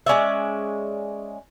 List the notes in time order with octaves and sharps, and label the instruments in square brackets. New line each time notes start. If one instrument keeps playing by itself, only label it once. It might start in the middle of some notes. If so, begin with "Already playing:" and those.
[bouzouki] G#3 C#4 D5 E5